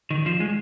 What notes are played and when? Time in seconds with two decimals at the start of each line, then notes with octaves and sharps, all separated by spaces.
0.11 D#3
0.26 F3
0.40 G#3